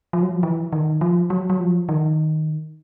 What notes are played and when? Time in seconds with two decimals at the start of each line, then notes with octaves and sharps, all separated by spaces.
0.13 F3
0.22 F#3
0.31 F3
0.43 E3
0.73 D#3
1.01 F3
1.30 F#3
1.50 F#3
1.60 F3
1.89 D#3